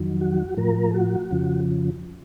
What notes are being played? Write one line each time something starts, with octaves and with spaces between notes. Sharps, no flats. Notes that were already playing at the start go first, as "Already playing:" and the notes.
Already playing: F2 D#3 F#3
F#4
A2 F3 A#4
A4
F#4
F2 C#3 F3